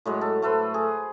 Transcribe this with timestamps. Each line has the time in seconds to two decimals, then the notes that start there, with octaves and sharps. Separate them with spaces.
0.06 A2 F#3 G#3
0.21 A4
0.42 A3 A4 B4 C5
0.74 G#4